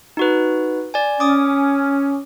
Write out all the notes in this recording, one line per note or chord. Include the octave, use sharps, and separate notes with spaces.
D#4 F#4 B4
D5 G#5
C#4 D6 D#6